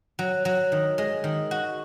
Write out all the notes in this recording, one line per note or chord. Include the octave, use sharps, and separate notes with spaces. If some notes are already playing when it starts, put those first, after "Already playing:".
F#3
F#3
D#3
G#3
D#3
F#4